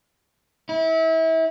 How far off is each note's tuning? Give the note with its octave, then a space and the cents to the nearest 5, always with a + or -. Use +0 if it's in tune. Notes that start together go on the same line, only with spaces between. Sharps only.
E4 -30